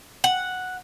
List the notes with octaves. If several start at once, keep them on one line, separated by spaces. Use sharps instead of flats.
F#5